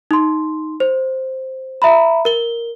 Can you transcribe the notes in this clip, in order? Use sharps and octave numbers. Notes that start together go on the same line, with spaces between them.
D#4 C6
C5
E5 A#5 B5
A#4 G7